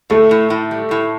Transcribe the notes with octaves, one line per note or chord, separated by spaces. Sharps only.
A2 A3
A2
A2
G3
A2